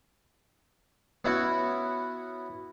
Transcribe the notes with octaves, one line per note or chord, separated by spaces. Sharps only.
B3 C#4 E4 F#4